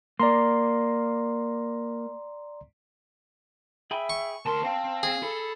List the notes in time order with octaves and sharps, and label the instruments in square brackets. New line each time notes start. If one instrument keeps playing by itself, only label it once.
[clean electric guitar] A#3 [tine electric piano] D5 A#5 C6
[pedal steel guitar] G#4 G5 B5 [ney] E5
[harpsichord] C#6
[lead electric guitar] D2 C6 [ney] A#4 [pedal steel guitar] A5
[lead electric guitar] C4 [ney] F5
[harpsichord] G#4
[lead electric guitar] A4 [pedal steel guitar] B5